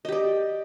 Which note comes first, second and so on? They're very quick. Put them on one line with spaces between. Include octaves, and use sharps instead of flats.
D#5 G4 D5